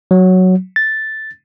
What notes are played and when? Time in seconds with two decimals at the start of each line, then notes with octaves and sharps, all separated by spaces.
0.11 F#3
0.76 A6